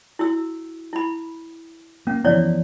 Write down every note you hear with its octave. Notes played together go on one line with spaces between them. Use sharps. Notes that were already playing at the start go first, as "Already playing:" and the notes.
E4 F#4 E6
E4 B5
A#3 C#4
E3 F3 B3 E4 C#5 D5